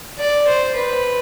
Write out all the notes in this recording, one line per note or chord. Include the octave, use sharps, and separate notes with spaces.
D5
C5
B4